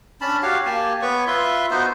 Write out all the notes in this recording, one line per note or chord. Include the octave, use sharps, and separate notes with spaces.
C#4 D4 A5 B5
F#4 G4 C#5 F5
A#3 G4 G#5 A5
B3 B4 C#5 C#6
F4 B4 E5 C6
B3 D#4 F#4 C5